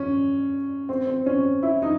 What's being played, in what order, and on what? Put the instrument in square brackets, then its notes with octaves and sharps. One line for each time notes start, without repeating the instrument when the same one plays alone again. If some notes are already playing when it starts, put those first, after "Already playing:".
Already playing: [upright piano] C#4
C4
C4
C#4
E4
D#4